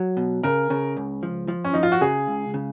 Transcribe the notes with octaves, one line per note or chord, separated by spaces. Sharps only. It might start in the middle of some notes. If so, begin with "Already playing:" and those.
Already playing: F#3
B2
C#3 A#4
C#3
C#2
F3
F3
C#4
F3 D#4
F4
F#4
C#3 G#4
C#2
C#3